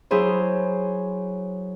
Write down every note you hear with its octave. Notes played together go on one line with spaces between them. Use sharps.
F#3 E4 G#4 C5